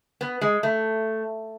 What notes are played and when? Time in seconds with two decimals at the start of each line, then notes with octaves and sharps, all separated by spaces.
0.21 B3
0.41 G#3
0.63 A3